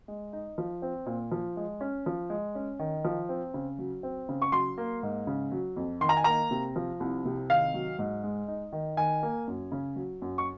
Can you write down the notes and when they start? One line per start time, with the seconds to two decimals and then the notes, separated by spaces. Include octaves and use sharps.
0.08 G#3
0.33 D#4
0.58 F3
0.82 C4
1.06 A#2
1.32 F3
1.57 G#3
1.81 C#4
2.06 F3
2.30 G#3
2.55 C#4
2.79 D#3
3.05 F3
3.29 C4
3.54 C#3
3.79 F#3
4.03 C4
4.29 C#3
4.42 C#6
4.52 F#3 C6
4.78 A#3
5.03 G#2
5.27 C#3
5.52 F#3
5.76 F2
6.01 D#3 C6
6.09 A#5
6.17 G#5
6.24 A#3 A#5
6.51 C3
6.76 F3
7.00 C2
7.25 C3
7.49 D#3 F5
7.74 F#3
7.99 G#2
8.24 G#3
8.48 D#4
8.73 D#3
8.97 D#3 G#5
9.23 A#3
9.47 F#2
9.72 C#3
9.96 F#3
10.22 F#2
10.38 C#6